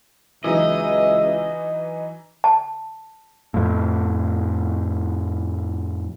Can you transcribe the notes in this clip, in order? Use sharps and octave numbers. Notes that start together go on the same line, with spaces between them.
C#2 E3 F#3 D#4 D#5 E5
A5
F2 A2